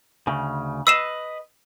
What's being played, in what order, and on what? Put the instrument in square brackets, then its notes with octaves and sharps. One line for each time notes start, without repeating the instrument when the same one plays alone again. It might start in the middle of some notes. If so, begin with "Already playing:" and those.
[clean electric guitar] D2 C#3
[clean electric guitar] B4 D#5 [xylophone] E6 C7 E7